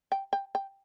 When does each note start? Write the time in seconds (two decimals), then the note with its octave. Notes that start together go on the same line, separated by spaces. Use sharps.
0.12 G5
0.33 G5
0.55 G5